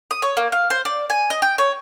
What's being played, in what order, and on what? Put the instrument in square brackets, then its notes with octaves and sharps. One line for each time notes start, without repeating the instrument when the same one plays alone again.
[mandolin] D#6
C#5
A#3
F5
C5
D5
G#5
D#5
G5
C#5